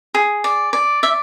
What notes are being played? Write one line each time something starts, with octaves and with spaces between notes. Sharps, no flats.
G#4
D5
D5
D5 E5